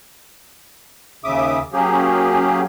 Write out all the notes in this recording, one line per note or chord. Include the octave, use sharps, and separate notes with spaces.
D#2 C#3 E5 D6 D#6
F#3 A#3 C#4 G4 G#4